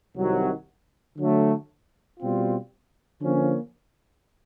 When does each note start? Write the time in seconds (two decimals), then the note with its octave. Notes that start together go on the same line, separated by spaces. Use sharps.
0.16 C2 C3 D#3 F#3
1.18 D3 F#3 A3
2.20 B2 G3 C4 F4
3.22 D3 F3 A#3 C#4